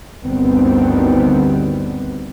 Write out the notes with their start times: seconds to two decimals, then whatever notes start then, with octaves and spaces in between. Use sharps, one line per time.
0.22 G1 D2 D#3 G3 B3 C4